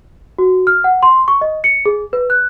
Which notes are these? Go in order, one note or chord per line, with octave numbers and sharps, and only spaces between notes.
F#4
F6
F#5
C6
C#6
D#5
C#7
G#4
B4
F#6